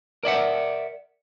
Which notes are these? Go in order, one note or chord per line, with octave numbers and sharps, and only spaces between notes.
A#4 D5 E5 F#5